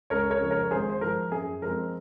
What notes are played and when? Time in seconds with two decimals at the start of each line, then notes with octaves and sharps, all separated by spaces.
0.10 C#2 A#4 C#5
0.30 A#4 C#5
0.41 C#3 F3 G#3
0.51 A#4 C#5
0.71 G#1 G#4 C5
0.90 C5
1.01 G#2 F3 A#4
1.32 F#2 G#4
1.62 F3 G#3 C4 A#4